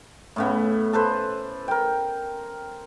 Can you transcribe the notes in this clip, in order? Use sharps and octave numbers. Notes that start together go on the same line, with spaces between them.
A2 C#3 B3
A4 B4 C5
A#4 G5